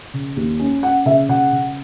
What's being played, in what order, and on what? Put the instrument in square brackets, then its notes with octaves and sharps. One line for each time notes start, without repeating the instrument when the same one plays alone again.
[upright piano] C#3
D#2
C#4
C#4 F#5
C#3 E5
C#3 F#5
C#3